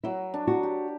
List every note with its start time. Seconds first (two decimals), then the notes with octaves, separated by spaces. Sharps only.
0.04 F#3 E4
0.34 D4
0.47 F#4
0.63 G4